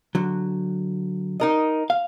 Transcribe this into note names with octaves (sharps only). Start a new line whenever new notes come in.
D3 F#3
D#4 A#4 D#5
F5